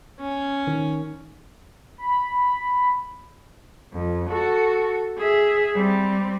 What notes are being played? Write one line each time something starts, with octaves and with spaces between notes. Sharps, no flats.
C#4
D#3
B5
F2
F#4 A4
G#4 E5
G3 C4